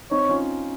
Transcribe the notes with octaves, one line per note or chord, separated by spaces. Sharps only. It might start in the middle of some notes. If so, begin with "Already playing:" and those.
C4 D#4 C#5
C#4 F4